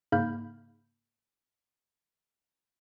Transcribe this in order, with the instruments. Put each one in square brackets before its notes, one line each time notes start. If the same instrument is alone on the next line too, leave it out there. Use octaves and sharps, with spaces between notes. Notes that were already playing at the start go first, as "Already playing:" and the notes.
[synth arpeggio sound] G#2 C#3 A#3 B5 F6 G6